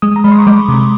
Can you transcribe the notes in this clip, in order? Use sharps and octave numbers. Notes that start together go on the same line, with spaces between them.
G#3 D#6
A#5
G#3 B5
C6
C#6
G#3 D6
C3